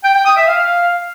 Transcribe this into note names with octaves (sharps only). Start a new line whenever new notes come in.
G5
G5
D#6
E5
F5